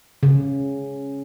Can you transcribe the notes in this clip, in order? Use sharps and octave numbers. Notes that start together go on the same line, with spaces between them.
C#3